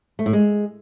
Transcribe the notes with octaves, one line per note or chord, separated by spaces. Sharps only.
A3
A2
G#3